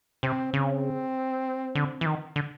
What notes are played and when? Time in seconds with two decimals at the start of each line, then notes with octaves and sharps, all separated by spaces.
0.23 C3 C4
0.53 C#3 C4
1.75 D3
2.01 E3
2.06 D#3
2.36 D3